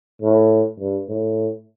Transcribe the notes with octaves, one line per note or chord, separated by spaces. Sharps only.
A2
G2
A2